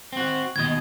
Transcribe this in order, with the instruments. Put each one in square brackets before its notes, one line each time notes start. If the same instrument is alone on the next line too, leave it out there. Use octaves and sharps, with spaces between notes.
[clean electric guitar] C4 F#4
[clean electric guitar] D#2 B2 D#5 [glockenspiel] G#6